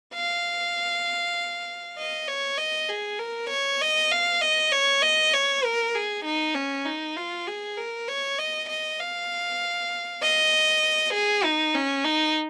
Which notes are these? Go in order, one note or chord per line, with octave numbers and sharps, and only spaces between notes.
F5
D#5
C#5
D#5
G#4
A#4
C#5
D#5
F5
D#5
C#5
D#5
C#5
A#4
G#4
D#4
C#4
D#4
F4
G#4
A#4
C#5
D#5
D#5
F5
D#5
G#4
D#4
C#4
D#4